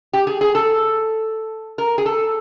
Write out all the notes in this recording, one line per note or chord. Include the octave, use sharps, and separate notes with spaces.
G4
G#4
G#4
A4
A#4
G#4
A4